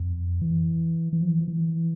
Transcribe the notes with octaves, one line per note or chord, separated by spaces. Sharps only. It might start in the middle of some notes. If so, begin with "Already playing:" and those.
Already playing: F2
E3
E3
F3
E3
E3